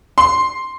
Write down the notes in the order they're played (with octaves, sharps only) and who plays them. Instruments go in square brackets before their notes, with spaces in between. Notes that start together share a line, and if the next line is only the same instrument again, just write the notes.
[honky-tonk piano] C6